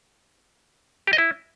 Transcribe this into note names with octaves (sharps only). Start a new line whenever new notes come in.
G4
D#5
E4